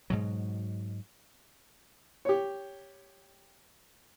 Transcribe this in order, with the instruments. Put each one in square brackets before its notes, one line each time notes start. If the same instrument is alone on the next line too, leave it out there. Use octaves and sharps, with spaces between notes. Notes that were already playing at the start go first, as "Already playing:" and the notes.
[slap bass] G#2 B2 F#3
[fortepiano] G4 C#5